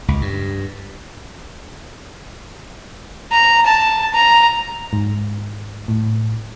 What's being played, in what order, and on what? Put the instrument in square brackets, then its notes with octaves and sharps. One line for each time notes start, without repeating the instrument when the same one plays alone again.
[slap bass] C#2
G2
[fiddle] A#5
A5
A#5
[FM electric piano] G#2
A2